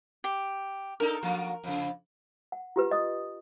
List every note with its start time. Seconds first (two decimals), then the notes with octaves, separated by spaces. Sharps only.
0.24 G4
1.00 D4 D#4 A4 A#4
1.23 F3 A#3 F#4
1.64 F2 C#3
2.52 F#5
2.76 F4 G4 B4
2.91 D#5 D#6